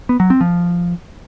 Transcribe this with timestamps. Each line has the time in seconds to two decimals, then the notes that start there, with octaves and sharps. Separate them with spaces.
0.09 B3
0.20 F#3
0.30 C4
0.41 F3